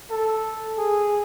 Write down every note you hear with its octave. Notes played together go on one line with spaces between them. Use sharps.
A4
G#4